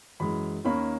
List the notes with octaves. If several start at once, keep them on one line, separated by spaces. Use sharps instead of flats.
F#2 E3 G#3 B5
D#2 D#3 A#3 C#4 B5